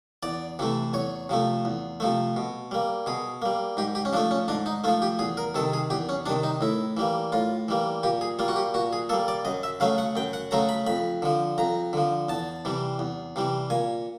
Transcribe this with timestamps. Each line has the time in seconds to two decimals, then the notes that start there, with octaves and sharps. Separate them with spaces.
0.23 E2 D5
0.59 C3 E3 A3
0.93 E2 C#5
1.29 C3 F3 A3
1.65 E2
2.00 C3 F3 A3
2.36 B2
2.71 G3 A#3
3.06 B2 G#4
3.42 G3 A#3
3.77 G#2 G4
3.95 G4
4.05 C#4
4.13 F3 D4
4.16 A3
4.31 C#4
4.48 G#2 D4
4.66 D#4
4.84 A3 F4
4.88 F3
5.02 G4
5.19 E2 G#4
5.37 A#4
5.54 C3 D#3 A4
5.73 G#4
5.90 E2 G4
6.09 C#4
6.26 C3 D#3 D4
6.43 D#4
6.61 A2 E4
6.97 E3 G3 A#3
7.32 A2 F4
7.68 E3 G3 A#3
8.03 A#2 G4
8.21 G#4
8.39 G3 A#3 F4
8.48 F#4
8.56 G4
8.74 A#2 F#4
8.93 G#4
9.09 G3 A#3 A4
9.28 D5
9.45 F#2 D#5
9.63 E5
9.80 C#3 F#3 A3 F5
9.98 F#5
10.16 F#2 G5
10.33 F#5
10.51 C#3 F#3 A3 A#5
10.69 B5
10.87 F2 B5
11.22 D3 F3
11.58 F2 A#5
11.93 D3 F3
12.29 E2 A5
12.65 C3 E3 G3
12.99 E2
13.36 C3 E3 G3
13.70 A#2 G#5